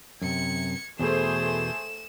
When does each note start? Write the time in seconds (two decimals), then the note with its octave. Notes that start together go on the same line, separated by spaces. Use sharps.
0.22 F#2 C3 G#6 C#7
0.99 E2 B2 E3 A3 G#4 C5 E7